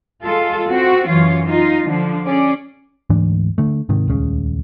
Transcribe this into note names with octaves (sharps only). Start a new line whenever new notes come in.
G#3 F4 A4
C4 F#4
F#2 E3 F4 C#5
D#4 F4
D3 F3
C#4 G#4 D5
D2 G#2 E3 D4
D3 A3
G#2 C3 D#3
D#1 C#2 C#3